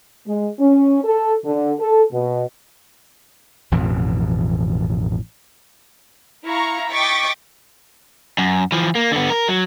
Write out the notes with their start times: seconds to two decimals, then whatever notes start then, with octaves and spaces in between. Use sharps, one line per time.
0.27 G#3
0.59 C#4
1.03 A4
1.45 D3
1.79 A4
2.12 B2
3.72 A1 F2 B2 E3
6.45 E4 F5 A#5 C#6
6.91 D#5 G5 C#6 D6 A6 B6
8.38 F#2
8.72 E3 F3
8.95 A#3
9.12 D3 B3
9.30 A#4
9.48 F#3